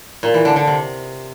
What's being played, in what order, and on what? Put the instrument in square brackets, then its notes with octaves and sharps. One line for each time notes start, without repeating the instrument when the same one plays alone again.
[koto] A#2
E3
D3
D3
C3